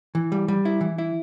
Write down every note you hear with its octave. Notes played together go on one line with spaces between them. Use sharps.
E3
G3
G3
E4
E3
E4